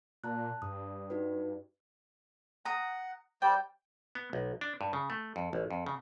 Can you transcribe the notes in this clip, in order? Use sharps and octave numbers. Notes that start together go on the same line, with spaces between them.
A#2 A5 A#5 F#6
G2 D#6
D#4 F#4 B4
F#5 A#5 D#6
G3 C5 D5 G5
B3
B1
D4
G2
C#3
A3
F2
A1
F2
C#3